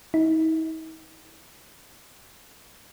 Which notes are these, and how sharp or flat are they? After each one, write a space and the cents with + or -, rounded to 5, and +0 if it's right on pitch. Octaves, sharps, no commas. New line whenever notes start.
D#4 +45